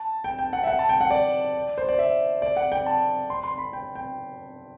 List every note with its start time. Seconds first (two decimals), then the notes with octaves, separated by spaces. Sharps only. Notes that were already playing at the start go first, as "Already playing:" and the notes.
Already playing: A5
0.24 G5
0.39 G5
0.53 F#5
0.63 E5
0.67 F#5
0.79 A5
0.89 G5
1.01 F#5
1.11 D5
1.78 C5
1.89 D5
1.99 E5
2.42 D5
2.57 F#5
2.72 G5
2.86 A5
3.30 C6
3.44 C6
3.58 B5
3.73 G5
3.95 G5